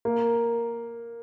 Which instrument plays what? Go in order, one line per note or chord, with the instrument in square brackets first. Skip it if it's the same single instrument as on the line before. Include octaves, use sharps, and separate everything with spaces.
[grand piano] A#3